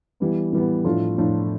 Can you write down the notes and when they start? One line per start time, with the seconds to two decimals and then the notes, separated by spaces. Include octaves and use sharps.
0.20 E3 G3 B3
0.53 E3 G3 B3
0.84 A2 F3 A3 D4 F4
1.17 A2 F3 A3 D4 F4